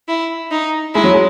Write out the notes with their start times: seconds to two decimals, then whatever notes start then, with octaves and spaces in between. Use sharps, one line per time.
0.08 E4
0.51 D#4
0.95 G#3 E4
1.04 F#3
1.14 G#3